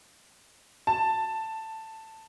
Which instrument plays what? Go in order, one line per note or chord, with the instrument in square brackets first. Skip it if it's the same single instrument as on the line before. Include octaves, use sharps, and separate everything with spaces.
[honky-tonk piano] A5